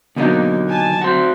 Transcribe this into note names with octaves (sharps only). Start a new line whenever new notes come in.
D#2 B2 D3 F#3 A#3 C4 D#4
G#5 A5
C4 F#4 C5